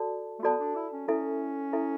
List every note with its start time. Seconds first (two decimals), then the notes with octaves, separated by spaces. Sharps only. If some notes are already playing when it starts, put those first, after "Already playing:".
Already playing: F#4 A4 D5 A5
0.39 A3
0.43 B3 F#4 A4 D5 A5
0.60 D4
0.76 E4
0.92 C#4
1.08 C#4 E4 A4 E5
1.73 E4 A4 E5